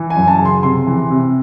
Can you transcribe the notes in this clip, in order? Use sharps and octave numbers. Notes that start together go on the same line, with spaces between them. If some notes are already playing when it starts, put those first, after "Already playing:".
Already playing: E3
G#5
F#2
A5
C#3
C6
C3 C6
E3
C3